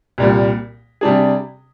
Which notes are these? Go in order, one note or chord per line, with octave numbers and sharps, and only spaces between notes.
C2 A#2 G3
C3 G3 D4 G#4